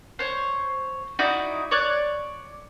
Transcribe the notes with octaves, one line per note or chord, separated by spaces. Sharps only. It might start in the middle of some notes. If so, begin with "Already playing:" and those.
C5 C#5
D#4 E4 F#4 D5
C#5 D5 F#6